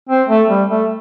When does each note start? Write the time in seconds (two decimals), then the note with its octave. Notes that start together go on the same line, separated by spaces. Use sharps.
0.09 C4
0.29 A3
0.50 G3
0.70 A3